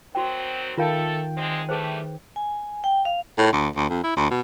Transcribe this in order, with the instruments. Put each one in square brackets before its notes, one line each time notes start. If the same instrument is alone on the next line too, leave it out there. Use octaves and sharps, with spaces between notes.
[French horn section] D#3 F#3 C4 [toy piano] F#4 G5
[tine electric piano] D#3 G5 [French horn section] A3 A4 [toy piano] F4 A#4 F5
[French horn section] D2 G#3 C4
[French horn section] E3 G3 A3 [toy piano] G#4 B4 C5
[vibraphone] G#5
G5
F5
[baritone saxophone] A2
D2
D2
F2
E4
D2
B2